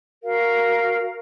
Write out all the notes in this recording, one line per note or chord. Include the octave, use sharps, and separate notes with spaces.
F#4 A#4 F5